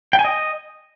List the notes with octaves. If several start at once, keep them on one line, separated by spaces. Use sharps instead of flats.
G5
G#5
D#5